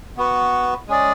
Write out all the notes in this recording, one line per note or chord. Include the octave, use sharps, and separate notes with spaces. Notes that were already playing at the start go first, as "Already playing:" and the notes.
B3 F#4 B4
G#3 C#4 G#4 D5